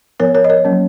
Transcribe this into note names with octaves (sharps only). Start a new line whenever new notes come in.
F3 B3 A#4 C#5
A#4 C#5
D#5
A#4 C#5
F#3 A#3 C#4